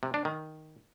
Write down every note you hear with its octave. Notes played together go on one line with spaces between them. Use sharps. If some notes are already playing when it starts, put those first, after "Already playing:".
C3
D4
D#3